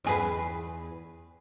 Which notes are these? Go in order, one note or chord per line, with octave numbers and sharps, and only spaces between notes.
E2 G#4 B4